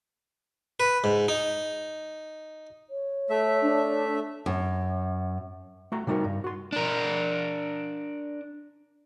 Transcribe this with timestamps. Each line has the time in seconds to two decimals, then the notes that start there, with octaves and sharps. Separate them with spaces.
0.80 B4
1.04 G#2
1.28 D#4
2.90 C#5
3.30 A3 E5
3.62 D4
4.46 F#2
5.92 A3 F#4 A#5
6.07 C3 G3 D#4 F#4 A#4
6.24 G2
6.44 F#4 C6
6.72 D4 A#4